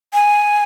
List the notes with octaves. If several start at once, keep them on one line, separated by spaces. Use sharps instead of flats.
G#5